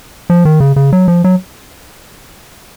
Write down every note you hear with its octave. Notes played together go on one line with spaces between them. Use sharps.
F3
D#3
C#3
C#3
F#3
F3
F#3